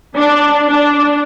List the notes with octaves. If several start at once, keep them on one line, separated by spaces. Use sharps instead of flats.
D4
D4